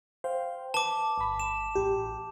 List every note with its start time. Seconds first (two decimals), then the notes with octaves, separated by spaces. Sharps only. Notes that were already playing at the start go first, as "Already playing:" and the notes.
0.24 C5 F5 G5
0.74 B4 A5 D6
1.18 G1 B5
1.40 E7
1.75 A1 G4